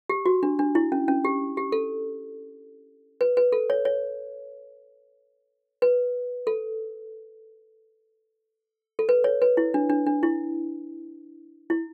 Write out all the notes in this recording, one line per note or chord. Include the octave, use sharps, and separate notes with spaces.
G4
F#4
D4
D4
E4
C#4
C#4
G4
G4
A4
B4
B4
A4
C#5
C#5
B4
A4
A4
B4
C#5
B4
E4
D4
D4
D4
E4
E4